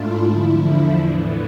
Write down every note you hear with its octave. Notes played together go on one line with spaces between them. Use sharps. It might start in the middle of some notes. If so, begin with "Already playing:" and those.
Already playing: G#2 A3 D4 E4 F4
E2 D3 F3 E4
D4
A2 E3 B3